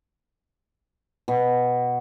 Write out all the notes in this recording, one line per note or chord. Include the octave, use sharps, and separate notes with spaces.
B2